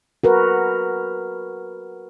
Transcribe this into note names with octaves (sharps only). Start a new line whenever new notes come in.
F#4 A#4 B4